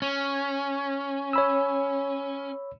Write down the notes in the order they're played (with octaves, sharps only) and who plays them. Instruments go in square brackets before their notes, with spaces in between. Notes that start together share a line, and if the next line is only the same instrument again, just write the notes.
[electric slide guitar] C#4
[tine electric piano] C#5 B5 E6